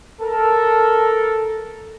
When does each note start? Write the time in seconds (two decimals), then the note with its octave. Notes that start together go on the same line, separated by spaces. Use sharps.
0.21 A4 A#4